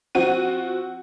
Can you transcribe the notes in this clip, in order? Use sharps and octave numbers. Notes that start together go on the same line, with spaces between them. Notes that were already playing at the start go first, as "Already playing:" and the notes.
F3 C4 F#4 D#7